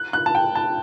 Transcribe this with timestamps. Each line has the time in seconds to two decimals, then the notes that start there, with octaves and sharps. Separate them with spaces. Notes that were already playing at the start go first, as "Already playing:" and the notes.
Already playing: F#6
0.13 F#6
0.26 A5
0.35 G5
0.55 A5